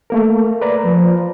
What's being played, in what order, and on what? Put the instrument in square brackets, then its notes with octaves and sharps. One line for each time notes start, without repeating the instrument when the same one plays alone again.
[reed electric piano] A3 A#3 A#4
B4 D5 A#5
[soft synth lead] F3